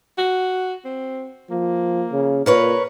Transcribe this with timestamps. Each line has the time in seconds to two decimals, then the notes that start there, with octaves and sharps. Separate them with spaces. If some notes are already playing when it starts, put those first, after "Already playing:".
0.18 F#4
0.85 C4
1.50 F3 A#3
2.12 C#3
2.46 A#2 A#4 B4 C#5